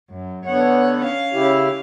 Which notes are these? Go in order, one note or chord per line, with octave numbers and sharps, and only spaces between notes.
F#2
D3 B3 C#5 F#5
C#4 F5
C#3 E4 G4